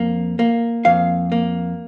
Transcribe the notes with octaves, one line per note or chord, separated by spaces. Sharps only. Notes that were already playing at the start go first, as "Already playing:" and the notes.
Already playing: F2 A#3
A#3
F2 F5
A#3